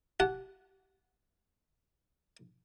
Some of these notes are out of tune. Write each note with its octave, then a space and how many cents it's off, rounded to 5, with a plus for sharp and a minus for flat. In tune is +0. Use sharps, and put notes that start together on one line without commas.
G4 -30 F#5 +0 A5 -30